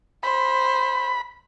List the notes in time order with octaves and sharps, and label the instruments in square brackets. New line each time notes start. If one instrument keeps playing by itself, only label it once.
[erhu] C5 [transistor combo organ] B5